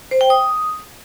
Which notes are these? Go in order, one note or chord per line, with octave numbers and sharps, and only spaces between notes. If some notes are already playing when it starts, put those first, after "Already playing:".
C5
G5
D#6